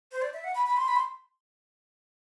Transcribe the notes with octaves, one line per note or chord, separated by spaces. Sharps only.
C5
D5
E5
F#5
B5
B5
C6
B5
C6